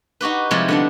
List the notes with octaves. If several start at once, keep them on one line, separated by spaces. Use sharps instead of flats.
D#4 F#4 G4 B4
C3 F3 G3 G#3 E4 G4
D3 B3 D4